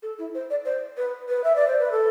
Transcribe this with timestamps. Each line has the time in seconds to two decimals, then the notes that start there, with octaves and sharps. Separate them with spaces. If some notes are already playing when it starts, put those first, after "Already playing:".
0.03 A4
0.19 E4
0.35 C5
0.50 D5
0.65 C5
0.97 B4
1.29 B4
1.44 E5
1.56 D5
1.67 C5
1.80 B4
1.92 A4